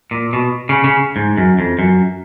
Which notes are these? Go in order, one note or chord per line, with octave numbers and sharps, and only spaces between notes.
A#2
B2
C#3
C#3
G#2
F#2
F2
F#2